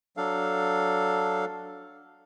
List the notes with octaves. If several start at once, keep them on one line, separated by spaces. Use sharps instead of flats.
F#3 D4 A4 F5